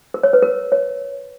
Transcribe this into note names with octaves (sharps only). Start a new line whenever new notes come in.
A#4
C#5
B4
A#4
C#5